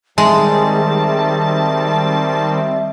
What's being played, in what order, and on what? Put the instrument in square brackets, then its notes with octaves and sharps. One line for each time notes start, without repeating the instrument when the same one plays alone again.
[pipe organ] D#3 G3 C4 [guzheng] G#3 [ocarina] E5 [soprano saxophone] A5